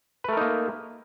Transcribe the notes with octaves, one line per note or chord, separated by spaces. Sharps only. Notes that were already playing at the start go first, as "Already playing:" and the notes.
A3 A#3 D#4 A#4 B4